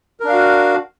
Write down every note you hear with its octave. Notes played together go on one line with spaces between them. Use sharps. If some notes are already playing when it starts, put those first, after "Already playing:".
D4 F#4 A#4 F5